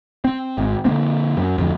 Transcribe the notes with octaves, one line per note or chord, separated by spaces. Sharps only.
C4
G#1
D3 A#3 C4
F#2
D1 F2